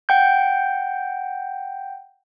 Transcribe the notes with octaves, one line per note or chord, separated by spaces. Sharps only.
F#5 G5 G6